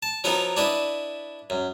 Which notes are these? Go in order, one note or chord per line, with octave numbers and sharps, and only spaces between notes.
A5
F3 F#3 B3 D#4 A#4
D4 E4 B4 D#5
F#2